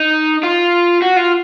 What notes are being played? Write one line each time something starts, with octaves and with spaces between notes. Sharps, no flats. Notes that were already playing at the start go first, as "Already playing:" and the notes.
Already playing: D#4
F4
F#4
F4